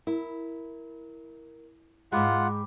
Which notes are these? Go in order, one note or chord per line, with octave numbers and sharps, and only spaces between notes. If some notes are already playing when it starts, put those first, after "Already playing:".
E4 A#4
G#2 G#3 F4 F#5 G5 B5 D6